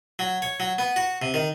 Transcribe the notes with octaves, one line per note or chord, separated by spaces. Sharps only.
F#3
C#5
F#3
B3
F#4
C3
D#3